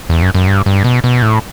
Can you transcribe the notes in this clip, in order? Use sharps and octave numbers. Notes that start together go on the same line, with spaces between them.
E2
F#2
F#2
G2
G2
B2
B2
A2